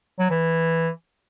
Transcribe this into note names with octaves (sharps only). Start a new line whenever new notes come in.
F#3
E3